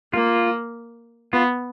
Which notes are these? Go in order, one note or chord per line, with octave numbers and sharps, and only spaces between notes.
A#3 F4
B3 F4